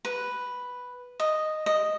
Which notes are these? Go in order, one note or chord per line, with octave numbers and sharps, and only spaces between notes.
B4
D#5
D#5